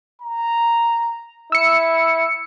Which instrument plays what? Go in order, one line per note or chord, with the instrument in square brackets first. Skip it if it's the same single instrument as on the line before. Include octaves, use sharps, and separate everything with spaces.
[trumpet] A#5
[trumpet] E4 [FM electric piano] E6 C#7